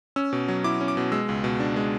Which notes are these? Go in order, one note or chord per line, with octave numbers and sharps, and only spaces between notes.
C#4 E6
B2
F#3
E4 D6
C#4
D6
B2
G#3 E6
C#2
B2
D4
G#3